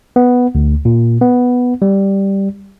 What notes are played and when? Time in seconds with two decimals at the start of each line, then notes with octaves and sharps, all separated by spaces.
0.16 B3
0.55 D2
0.85 A#2
1.21 B3
1.82 G3